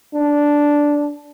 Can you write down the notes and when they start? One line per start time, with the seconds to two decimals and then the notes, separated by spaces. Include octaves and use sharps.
0.14 D4